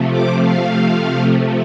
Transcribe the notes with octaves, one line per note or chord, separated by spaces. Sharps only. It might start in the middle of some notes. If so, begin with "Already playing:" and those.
Already playing: C3 F3 A3
D6
F5